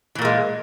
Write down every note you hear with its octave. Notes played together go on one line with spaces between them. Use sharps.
A#2 E3 G#3 A#3